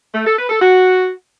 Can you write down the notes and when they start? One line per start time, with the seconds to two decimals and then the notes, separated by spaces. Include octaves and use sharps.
0.13 A3
0.25 A4
0.36 B4
0.48 A4
0.59 F#4